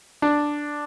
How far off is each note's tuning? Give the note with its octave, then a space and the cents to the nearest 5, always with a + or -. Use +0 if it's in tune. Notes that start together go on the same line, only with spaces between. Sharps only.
D4 +0